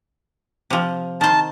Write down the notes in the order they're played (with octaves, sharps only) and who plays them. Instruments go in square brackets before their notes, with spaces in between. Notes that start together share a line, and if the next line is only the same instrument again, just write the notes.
[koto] C3 F3
[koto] D#3 C5 [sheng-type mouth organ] A5